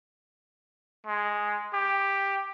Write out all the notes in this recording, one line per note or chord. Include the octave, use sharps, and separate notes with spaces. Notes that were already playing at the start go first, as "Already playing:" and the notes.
G#3
G4